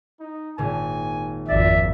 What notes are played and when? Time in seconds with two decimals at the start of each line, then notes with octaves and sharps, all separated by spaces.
0.20 D#4
0.58 G#1 A#2 G#5
1.48 G#1 F2 D5 E5 A6